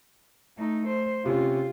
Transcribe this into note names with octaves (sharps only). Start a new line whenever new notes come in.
A3 D#4
C5
C3 C#4 F4